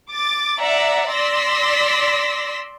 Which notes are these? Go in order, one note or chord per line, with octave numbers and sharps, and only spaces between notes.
D6 A6
D5 E5 F#5 A#5
D5 C6 E6 A#6 B6